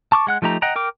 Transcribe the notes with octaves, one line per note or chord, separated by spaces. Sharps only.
A5 C#6 D6
G#3 F#5 F#6
F3 A3 D#4 G4 A#5
D#5 F#5 G5 A#5
A#4 G5 D6